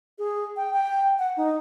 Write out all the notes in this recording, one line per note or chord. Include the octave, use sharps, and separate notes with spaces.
G#4
G5
G5
F#5
D#4